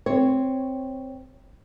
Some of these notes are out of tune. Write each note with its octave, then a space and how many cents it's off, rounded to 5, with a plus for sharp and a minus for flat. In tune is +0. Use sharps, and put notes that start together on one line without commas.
C4 +0 C#5 +0